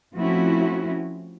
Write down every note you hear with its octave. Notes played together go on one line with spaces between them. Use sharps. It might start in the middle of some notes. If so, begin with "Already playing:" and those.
F3 A3 C4 C#4 E4 F#4